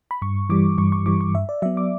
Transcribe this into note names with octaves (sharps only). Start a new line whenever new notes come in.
B5
G2 C#6
E3 G3 D6
G2 C#6
C#6
E3 G3 D6
C#6
G2 E5
D5
F#3 B3 E5
D6